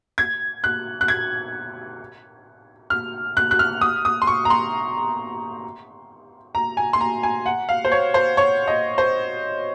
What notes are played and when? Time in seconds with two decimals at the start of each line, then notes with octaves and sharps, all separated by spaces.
0.18 G#6
0.64 F#6
1.01 F#6
1.08 G#6
2.90 F6
3.37 F#6
3.51 F#6
3.59 F6
3.81 D#6
4.05 D#6
4.22 C6
4.27 C#6
4.45 A#5
4.50 C6
6.55 A#5
6.77 G#5
6.93 C6
7.01 A#5
7.23 G#5
7.46 F#5
7.69 F5
7.85 C5
7.92 C#5
8.14 C5
8.37 C#5
8.68 D#5
8.98 C5